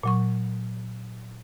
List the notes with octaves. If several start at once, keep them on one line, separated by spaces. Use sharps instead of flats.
A#2 F#3 C#6